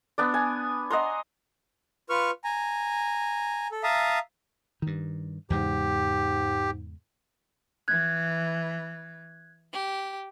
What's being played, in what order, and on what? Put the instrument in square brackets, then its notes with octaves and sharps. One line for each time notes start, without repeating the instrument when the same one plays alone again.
[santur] B3 D4 D5
G#5
D#5 F#5 A#5 C6
[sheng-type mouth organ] F4 B4 C#6 F6
G#5 A#5
A4
E5 F5 A5 A#5 D#6
[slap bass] G2 D#3
[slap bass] E2 C#3 G#3 [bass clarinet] G#2 [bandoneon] G4
[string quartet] E3 [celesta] F#6 G#6
[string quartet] G4